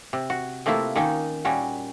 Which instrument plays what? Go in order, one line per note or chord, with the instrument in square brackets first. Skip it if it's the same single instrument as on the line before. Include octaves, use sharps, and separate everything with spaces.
[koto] C3
F#4
C3 A3 A#3 E4 F4
D#3 A#3 C#4 D#4
A#2 G3 C#4 F#4